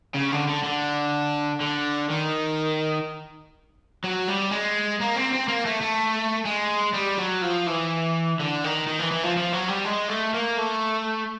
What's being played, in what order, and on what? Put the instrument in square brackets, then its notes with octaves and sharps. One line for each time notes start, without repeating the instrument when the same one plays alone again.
[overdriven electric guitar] C#3
D3
D3
D3
D3
D#3
F#3
G3
G#3
A#3
C4
C4
A#3
A3
A3
G#3
G3
F#3
F3
E3
D3
D#3
D#3
E3
E3
F3
F3
F#3
G3
G#3
A3
A#3
A3